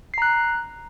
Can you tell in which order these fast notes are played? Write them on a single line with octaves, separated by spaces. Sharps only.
C7 A#5 F#6